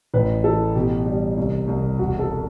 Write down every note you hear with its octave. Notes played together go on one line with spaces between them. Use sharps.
A1 B4
E3 A4
B2 G4
G3
C2
C2
E1 F#4
A4